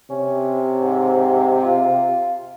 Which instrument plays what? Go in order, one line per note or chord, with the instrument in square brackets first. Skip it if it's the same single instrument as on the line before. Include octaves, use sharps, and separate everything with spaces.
[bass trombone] C3 [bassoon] C#4
[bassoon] G#2
F4